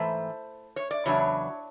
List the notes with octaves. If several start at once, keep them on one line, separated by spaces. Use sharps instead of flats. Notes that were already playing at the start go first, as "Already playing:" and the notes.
Already playing: G#2 E3 A3 C5
C#5
D5
E2 C#3 F#3 D4 C#5